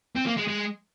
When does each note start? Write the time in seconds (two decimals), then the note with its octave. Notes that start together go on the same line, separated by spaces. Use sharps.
0.15 C4
0.26 A#3
0.37 G#3
0.47 G#3